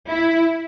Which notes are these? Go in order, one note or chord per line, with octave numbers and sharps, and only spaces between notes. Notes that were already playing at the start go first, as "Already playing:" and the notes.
E4